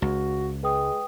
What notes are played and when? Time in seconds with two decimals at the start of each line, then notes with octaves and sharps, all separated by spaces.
0.02 C#2 F#4
0.63 G#3 B4 G5 D#6